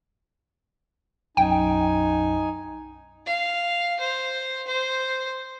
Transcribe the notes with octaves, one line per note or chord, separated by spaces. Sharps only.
B1 F#2 D#4 G5 G#5
F5
C5
C5